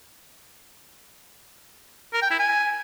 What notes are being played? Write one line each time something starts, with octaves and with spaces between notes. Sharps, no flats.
A#4
G5
E4
G#5